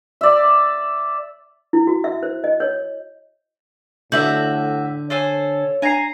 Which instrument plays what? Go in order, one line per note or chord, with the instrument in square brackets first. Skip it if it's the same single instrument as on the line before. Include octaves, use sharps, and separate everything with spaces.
[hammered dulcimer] D5 E5
[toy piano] E4
F#4
E5
C5
D#5
C#5
[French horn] A2 [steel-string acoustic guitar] D3 [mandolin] F#4 E5 F#5 [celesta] G6 F#7
[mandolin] A4 C5 G#5 [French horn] C#5
[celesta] D4 C7 [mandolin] G#5 A#5